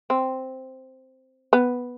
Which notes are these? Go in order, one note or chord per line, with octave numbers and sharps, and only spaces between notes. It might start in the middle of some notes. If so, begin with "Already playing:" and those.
C4
B3